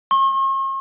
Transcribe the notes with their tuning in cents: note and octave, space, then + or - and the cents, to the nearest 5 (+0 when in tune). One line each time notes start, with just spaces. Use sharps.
C#6 -45